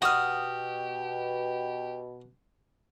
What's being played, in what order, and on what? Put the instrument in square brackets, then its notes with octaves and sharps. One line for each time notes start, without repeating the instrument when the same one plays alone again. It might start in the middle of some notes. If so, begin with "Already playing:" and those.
[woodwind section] B2 [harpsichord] F#4 [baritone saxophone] G4 [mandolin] D#6 F6